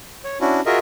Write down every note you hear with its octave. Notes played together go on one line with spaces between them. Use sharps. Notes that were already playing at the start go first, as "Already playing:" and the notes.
C#5
C#4 D4 E4 F#4
F4 F#4 G#4 A#4 D#5 E5